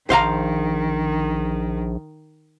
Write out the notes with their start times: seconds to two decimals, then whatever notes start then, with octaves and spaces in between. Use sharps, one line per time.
0.10 A#1 D#3 C5 F5 A#5